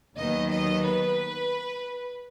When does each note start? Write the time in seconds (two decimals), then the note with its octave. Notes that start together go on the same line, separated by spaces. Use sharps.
0.16 D#2 D#3 F#3 B3 D#5
0.51 D#5
0.85 B4